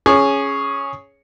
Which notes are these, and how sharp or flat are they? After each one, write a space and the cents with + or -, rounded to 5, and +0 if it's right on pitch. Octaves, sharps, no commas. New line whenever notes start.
C#4 +0 G#4 +5 D#6 -35